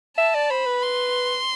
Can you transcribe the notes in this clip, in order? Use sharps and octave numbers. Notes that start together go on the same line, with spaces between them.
E5 A5
D5
C5 B5
B4
C6